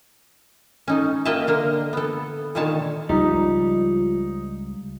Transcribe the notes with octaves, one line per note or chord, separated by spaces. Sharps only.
C#4 D#4 A4
A#3 D#5 E5 G5 A5
D3 A#3 A#4
B3 A4
A#2 D3 D#3 C#5 A5
C#2 F3 G3 D#4